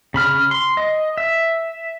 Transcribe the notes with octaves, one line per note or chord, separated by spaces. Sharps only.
C#3 B5 F6
C6
D#5
E5